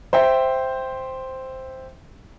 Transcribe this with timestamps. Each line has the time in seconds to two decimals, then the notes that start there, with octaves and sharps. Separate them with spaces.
0.13 C5 E5 G5